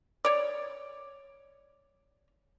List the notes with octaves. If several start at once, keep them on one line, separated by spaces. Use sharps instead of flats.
C#5 D5